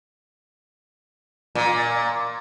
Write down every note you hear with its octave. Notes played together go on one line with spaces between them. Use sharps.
A#2